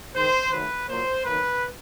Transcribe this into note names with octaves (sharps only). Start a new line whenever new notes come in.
D#3 G#3 C5
D#3 F#3 A3 B4
A#2 F#3 A#3 C5
D#3 F#3 A#3 B4